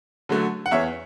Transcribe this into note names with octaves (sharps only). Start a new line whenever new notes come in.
D3 F#3 A3
F#5
E2 C#5 E5